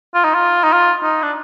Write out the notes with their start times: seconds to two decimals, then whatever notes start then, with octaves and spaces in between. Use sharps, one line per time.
0.14 F4
0.24 D#4
0.34 F4
0.64 D#4
0.73 F4
1.03 D#4
1.23 D4